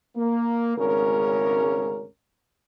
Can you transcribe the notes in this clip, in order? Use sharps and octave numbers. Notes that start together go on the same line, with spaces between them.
A#3
G#1 D2 C#3 G#3 C#4 A#4